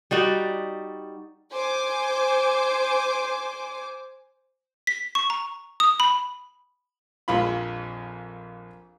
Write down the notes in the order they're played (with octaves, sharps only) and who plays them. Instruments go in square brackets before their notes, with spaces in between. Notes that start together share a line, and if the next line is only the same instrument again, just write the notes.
[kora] G3 D#4 F#4 D5
[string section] C5 G#5 D6
[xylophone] B6
C#6
A#5
D#6
B5
[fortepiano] A#1 F2 F4 B5